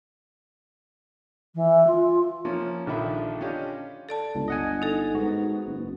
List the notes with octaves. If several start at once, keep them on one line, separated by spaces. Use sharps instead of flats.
E3
F4
F3 A#3 C#4
A#1 D3 D#3 F3 E5 B5
C#4 D4 F4 G4 D#5
A4 D5 A5
G1 C#2
D#5 F#5 G#5
D#4 A4
G#2 B3 F#4
F#1